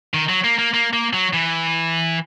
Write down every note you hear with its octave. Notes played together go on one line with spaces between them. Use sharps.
D#3
F#3
A#3
A#3
A#3
A#3
F#3
E3